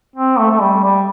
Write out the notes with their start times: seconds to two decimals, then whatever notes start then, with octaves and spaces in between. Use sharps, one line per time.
0.16 C4
0.39 A3
0.51 A3
0.61 G3
0.84 G3